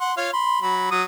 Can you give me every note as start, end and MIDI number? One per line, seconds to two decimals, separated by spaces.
0.01 0.12 78
0.01 0.12 84
0.17 0.28 65
0.17 0.28 73
0.17 0.28 77
0.33 0.60 83
0.33 0.60 84
0.62 0.89 54
0.62 0.89 83
0.91 1.03 54
0.91 1.03 87